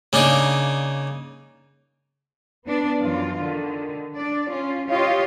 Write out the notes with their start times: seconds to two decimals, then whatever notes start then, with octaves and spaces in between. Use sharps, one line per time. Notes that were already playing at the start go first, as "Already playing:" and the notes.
0.13 C#3 A#3 D4 D#4
2.66 B3 D4
3.00 F#2 E3 F4
3.39 D3 D#3
4.16 D4 D5
4.49 C#4 F4
4.89 F4 G4 C#5 D#5 F5